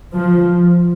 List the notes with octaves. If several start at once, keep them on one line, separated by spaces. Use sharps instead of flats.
F3